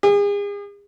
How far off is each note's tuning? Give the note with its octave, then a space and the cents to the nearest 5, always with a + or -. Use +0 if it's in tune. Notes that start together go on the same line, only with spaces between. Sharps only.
G#4 -40